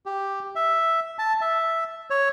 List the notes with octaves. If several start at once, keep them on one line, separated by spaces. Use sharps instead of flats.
G4
E5
A5
E5
C#5